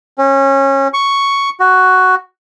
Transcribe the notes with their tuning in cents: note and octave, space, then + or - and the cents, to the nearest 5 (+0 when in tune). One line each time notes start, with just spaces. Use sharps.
C#4 -25
C#6 +5
F#4 +5